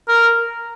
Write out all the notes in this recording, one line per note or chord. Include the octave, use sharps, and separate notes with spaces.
A#4